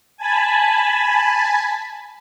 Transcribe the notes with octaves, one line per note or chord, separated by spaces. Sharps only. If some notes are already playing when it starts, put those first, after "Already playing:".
G#5 A5 B5